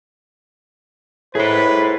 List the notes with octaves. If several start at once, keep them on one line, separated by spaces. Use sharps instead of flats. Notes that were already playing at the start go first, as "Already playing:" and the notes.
A2 G#4 B4 C5